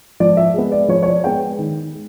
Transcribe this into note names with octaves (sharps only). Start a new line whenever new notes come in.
F3 D5
E5
G#3 B3
D5
F3 C#5
C#5
D5
G#3 B3 G5
D#3
G#3